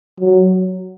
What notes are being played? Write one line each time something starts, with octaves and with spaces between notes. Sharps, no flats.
F#3